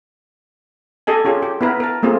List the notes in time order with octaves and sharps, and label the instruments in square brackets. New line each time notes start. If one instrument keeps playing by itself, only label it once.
[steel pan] G4 A4 D#5 G#5
C#4 F4 G4 G#4
G4
B3 E4 A#4 B4
A#4 A5
A3 A#3 C4 F4 G#4